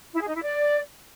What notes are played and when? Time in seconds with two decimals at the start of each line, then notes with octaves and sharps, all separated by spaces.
0.13 E4
0.20 G#4
0.28 D#4
0.35 E4
0.42 D5